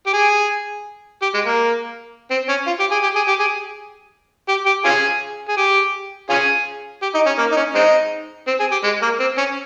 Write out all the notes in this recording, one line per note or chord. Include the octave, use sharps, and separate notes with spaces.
G4
G#4
G4
G#3
A#3
C4
C#4
F4
G4
G#4
G4
G#4
G4
G#4
G4
G4
C#4 F4 G#4
G#4
G4
C#4 F4 G#4
G4
D#4
C#4
A#3
D#4
C#4
G#3 C4 D#4
C4
G#4
G4
G#3
A#3
C4
C#4